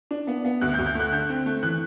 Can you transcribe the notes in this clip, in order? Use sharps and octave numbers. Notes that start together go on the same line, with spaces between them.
D4
B3
B3
D2 F#6
G6
D2
G6
A3 F#6
D3 G6
C4
A3
E3 F#6